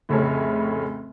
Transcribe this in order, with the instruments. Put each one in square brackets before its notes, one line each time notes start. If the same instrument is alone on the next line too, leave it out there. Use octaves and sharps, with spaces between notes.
[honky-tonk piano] F1 A2 C#3 A3 C#4